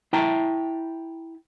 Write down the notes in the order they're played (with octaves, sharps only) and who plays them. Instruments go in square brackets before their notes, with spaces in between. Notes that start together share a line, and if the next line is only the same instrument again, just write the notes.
[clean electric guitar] E4 E5 G5 A5 A#5